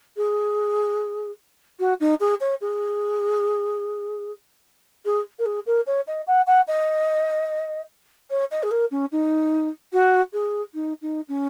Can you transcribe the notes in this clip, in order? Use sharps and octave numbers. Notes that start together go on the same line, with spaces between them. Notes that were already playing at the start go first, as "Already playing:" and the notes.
G#4
F#4
D#4
G#4
C#5
G#4
G#4
A#4
G#4
A#4
C#5
D#5
F#5
F#5
D#5
C#5
D#5
G#4
A#4
C#4
D#4
F#4
G#4
D#4
D#4
C#4